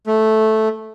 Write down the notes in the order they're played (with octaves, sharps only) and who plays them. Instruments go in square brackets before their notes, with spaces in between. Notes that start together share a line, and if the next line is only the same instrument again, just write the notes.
[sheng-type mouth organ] A3